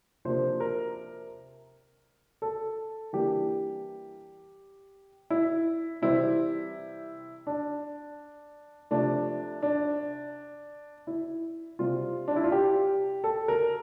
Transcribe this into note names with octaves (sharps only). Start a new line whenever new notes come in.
C3 F3 A#3 D4 C5
A#4
A4
E3 G3 A#3 D4 G4
E4
C3 E3 G3 C4 E4
D4
C3 F3 A3 D4
D4
E4
C3 G3 C4 F4
D4
E4
F4
G4
A4
A#4